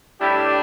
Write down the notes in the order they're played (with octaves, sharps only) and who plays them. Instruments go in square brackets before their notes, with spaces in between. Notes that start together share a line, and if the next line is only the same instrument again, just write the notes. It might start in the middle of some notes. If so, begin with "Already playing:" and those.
[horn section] A2 G3 D4 E4 G4